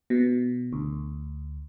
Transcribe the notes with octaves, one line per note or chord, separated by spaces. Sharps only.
B2
D2